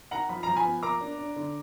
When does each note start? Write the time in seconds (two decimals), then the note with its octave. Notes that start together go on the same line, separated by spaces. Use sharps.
0.11 D#3 F#5 A#5
0.29 F3 B5
0.43 F3 A#5
0.56 G#5 B5
0.65 B3
0.83 A#3 A#5 D6
1.01 D4
1.18 D4
1.36 D3